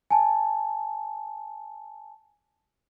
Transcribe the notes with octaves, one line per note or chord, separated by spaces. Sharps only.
G#5 A5